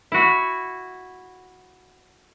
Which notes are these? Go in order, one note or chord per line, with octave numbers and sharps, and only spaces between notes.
E4 F#4